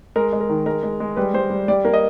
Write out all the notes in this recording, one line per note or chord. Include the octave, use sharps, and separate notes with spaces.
G#3 A#4
G#3
A#4
D#3
G#3 A#4
G#3
G#3
G3 B4
G3 C5
G3
G3 D5
A#3
D#5